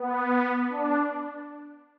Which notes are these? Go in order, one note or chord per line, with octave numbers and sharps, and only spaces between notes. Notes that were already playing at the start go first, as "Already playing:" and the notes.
Already playing: B3
D4